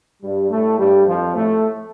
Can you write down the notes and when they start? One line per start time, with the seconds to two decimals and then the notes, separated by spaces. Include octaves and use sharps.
0.22 G2 G3
0.50 A2 A3
0.79 G2 G3
1.07 F2 F3
1.35 A2 A3